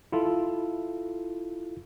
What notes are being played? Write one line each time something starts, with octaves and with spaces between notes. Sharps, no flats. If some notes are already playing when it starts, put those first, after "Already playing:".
E4 F4 A4